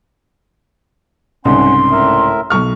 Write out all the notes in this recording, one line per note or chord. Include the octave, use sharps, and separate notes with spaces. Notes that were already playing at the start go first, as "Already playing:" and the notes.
C2 G#2 C#3 C#4 F#5 C6
A2 A#4 E5
B1 C#6 F6